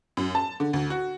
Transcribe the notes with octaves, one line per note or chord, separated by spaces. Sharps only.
F#2
A5
D3
D2
F#4